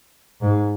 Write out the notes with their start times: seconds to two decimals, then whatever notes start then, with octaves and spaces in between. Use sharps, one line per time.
0.42 G#2